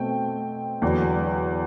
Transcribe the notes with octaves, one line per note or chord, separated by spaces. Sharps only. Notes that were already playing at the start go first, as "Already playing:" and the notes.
Already playing: B2 A3 C4 G5
E2 D3 F#3